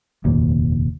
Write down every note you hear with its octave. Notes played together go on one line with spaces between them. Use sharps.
F1 D#2 A#2